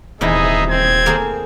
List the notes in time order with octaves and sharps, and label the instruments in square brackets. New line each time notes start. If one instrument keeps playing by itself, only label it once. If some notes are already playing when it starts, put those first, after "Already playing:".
[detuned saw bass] D#1 [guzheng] E2 C3 E4 [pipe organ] D#4 E5 [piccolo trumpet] G#4
[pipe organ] C4 [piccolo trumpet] G#6
[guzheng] A#3 G#4 A4